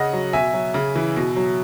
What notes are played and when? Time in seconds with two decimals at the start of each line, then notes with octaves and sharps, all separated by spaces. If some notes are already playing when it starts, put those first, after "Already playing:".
Already playing: C#3 D#5 F#5
0.13 F#3
0.33 B2 E5 G#5
0.54 F#3
0.74 C#3
0.95 E3
1.16 B2
1.36 F#3